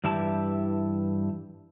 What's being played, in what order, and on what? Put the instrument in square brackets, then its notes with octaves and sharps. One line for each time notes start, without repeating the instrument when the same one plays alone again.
[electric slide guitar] G2 E3 E4 G4 A5